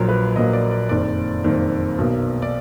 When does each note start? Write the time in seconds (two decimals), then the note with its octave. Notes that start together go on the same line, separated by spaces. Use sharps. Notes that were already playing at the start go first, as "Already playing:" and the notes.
Already playing: A#1 A#2 F#3 A#3 A#4
0.09 B4
0.36 A#1 A#2 F#3 A#3 D#5
0.53 D5
0.71 D5
0.89 F#1 F2 D#3 D5
1.44 F#1 F2 D#3
1.98 B1 B2 A#3
2.42 D5